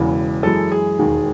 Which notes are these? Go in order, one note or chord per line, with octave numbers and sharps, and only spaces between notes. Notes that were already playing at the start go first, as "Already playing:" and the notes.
Already playing: E1 E2 C#3 E3
F#2 E3 G#3 A4
G#4
E1 D#2 D#3 G#3